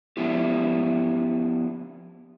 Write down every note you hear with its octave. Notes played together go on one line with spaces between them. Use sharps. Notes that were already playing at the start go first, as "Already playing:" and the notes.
F3 B3 D4 E4 F4 G4